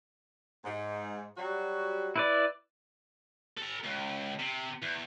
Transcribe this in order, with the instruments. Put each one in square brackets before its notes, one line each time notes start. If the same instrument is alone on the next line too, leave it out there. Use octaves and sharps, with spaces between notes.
[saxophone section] G#2
F#3 G3 F#4
[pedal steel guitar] E4 B4 D5
[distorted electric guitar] A4 A#5
C#2
C3
E2